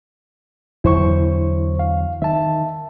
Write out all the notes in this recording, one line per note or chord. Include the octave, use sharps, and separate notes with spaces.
E2 D3 F#3 E4 C5 C#6
F5
D#3 E5 A5